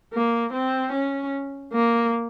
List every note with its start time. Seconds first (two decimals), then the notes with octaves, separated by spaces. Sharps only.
0.13 A#3
0.53 C4
0.92 C#4
1.72 A#3